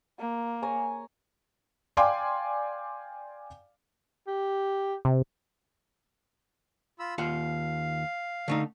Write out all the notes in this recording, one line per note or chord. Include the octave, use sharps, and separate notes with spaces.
A#3
C#5 G#5 A#5
D5 F5 G5 G#5 C6 D6
G4
C3
F4 B5 E6
D#2 F4 F5 F#5
D3 A3 D#4